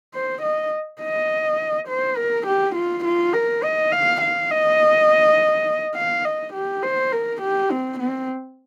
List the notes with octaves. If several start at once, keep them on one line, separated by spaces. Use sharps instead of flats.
C5
D#5
D#5
C5
A#4
G4
F4
F4
A#4
D#5
F5
F5
D#5
F5
D#5
G4
C5
A#4
G4
C4
C4